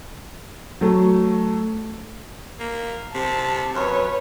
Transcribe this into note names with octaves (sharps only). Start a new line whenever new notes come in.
F#3 A3
A#3
C3 A5
F#2 B4 C#5